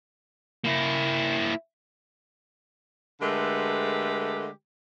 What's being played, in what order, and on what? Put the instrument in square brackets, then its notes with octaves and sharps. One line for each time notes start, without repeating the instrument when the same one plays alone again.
[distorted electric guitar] A#3 E4
[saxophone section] D3 G#3 A3 G4 A#4 B4